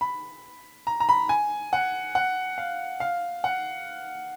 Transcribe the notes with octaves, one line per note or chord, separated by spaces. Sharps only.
B5
A#5
A#5
B5
G#5
F#5
F#5
F5
F5
F#5